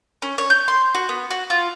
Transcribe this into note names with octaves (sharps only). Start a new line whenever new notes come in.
C#4
C#5
G6
C6
F#4
B3
F#4
F4